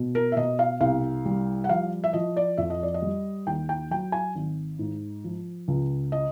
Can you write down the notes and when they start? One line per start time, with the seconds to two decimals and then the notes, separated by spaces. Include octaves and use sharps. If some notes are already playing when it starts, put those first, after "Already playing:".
Already playing: B2
0.15 A#4
0.32 E5
0.37 B2 D#5
0.59 F5
0.81 C2 F5
1.26 G3
1.64 F#5
1.69 F3 F5
2.04 E5
2.13 F3 D#5
2.37 D5
2.58 F2 E5
2.70 D#5
2.83 D5
2.94 D#5
3.02 G3
3.47 D#2 G5
3.69 G5
3.91 F#3 G5
4.12 G#5
4.35 G#1
4.79 G#2
5.24 F3
5.68 C#2
6.12 D#5